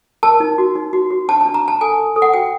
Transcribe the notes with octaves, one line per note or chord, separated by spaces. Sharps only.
A#4 A5
D#4
F#4
D#4
F#4
F#4
D4 A5
A5
D4
A#5
D4
A5
A4 G#5
A4
A4
F#5
F#4 G5